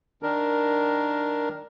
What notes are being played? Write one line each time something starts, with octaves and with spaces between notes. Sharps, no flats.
D#3 D4 A#4